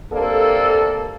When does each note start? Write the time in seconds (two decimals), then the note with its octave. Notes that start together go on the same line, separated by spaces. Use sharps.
0.12 C3 A#3 D4 A4